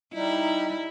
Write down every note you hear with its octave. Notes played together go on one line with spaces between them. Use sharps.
G3 D#4 E4